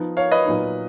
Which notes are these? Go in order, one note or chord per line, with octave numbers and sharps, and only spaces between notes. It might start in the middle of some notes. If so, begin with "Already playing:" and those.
Already playing: F3 B3 D#4
C#5 F5
B4 D#5
A#2 F#3 B3 D#4